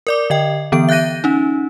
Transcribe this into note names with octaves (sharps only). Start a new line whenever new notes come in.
A#4 D5 D6
D3 D#5 G5
D3 E3 B3 D7
E5 F#6 G6 A#6 D#7
C#4 D#4